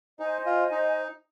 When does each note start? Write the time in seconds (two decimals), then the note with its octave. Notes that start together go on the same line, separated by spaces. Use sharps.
0.20 D#4 C5 D#5 G#5
0.46 F4
0.71 D#4